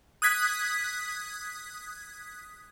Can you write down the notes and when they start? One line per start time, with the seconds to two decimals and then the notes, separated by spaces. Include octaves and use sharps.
0.22 D#6 F#6 G#6 B6